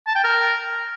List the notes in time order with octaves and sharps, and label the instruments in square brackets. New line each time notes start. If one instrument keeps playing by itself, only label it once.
[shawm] A5
G5
A#4